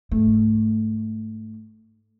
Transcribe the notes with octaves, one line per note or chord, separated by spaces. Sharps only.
G#2 A3